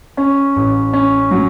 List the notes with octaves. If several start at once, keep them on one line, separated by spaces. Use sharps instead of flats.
C#4
A1
C#4
F#3